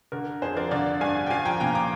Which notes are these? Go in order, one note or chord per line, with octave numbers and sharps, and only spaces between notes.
D3 A#4
F2 G#4 C5
A#4 D5
D3 D5 F5
G2 F5 G#5
G5
F3 F5 G#5
G5 A#5
A#2 G5 A#5
A#5 D6